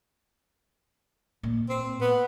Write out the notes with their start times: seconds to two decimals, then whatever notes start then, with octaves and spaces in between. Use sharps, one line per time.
1.43 A#2
1.69 C4
2.01 B3